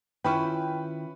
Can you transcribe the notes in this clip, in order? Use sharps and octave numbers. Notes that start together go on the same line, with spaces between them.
D#3 C#4 E4 F4 B4 G5 B5 C#6